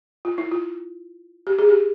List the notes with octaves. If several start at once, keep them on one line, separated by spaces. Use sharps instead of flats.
F4
E4
F4
G4
G#4
G4